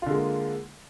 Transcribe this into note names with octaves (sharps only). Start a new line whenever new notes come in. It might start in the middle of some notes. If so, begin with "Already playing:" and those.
D3 G#3 A#3 F4